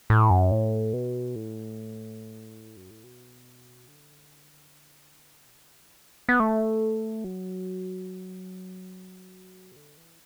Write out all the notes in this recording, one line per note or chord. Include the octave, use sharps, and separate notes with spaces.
A2
F#2
A2
B2
A2
F#2
A2
B2
D3
B2
D3
E3
B3
A3
F#3
B2
D3
E3